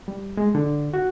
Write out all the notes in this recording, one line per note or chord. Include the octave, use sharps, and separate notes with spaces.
G3
G#3
D3
F#4